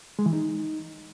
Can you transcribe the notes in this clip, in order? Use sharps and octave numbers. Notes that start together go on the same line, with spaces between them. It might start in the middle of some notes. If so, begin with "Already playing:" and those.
G#3
E3
D#4